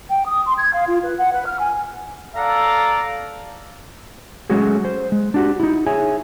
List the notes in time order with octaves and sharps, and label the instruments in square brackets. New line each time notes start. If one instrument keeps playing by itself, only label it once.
[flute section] G5
D#6
C6
G#6
F5
F4
B4
F#5
B4
F6
G#5
[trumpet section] A4 D5 F5 F#5 A#5
[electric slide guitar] F#3 G#3 A3 C#4 F#4 G#4
C5
G#3
D4 F#4 G4
D#4 E4
G#4 C#5 E5 G#5